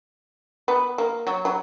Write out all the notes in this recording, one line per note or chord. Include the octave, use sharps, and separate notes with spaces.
B3
A#3
F#3
F#3